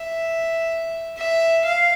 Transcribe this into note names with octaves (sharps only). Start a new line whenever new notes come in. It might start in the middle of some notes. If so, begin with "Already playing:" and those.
Already playing: E5
E5
F5